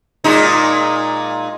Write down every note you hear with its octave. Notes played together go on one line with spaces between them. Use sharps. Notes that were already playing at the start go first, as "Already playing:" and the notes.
A#2 G#3 D#4